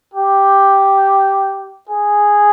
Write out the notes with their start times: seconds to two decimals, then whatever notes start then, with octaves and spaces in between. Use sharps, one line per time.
0.14 G4
1.89 G#4